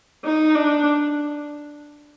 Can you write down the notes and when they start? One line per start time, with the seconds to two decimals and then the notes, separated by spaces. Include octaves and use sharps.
0.25 D#4
0.55 D4